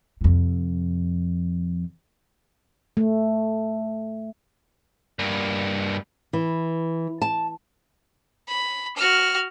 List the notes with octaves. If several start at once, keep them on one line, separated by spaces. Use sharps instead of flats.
F2 C3
A3
G2 A#3
E3
A5
B5
F#4 F6